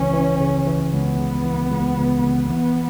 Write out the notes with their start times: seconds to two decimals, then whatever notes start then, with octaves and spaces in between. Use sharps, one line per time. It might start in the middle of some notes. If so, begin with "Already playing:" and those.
Already playing: C#2 C#3 E3 C#4
0.13 E3
0.40 C#3
0.66 E3
0.92 C#2 B3
1.18 C#2
1.45 E3
1.71 C#2
1.97 C#2
2.24 C#2
2.50 E3 B3